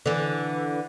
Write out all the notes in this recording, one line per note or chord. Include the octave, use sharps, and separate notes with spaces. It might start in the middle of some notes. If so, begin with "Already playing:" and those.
D3 E3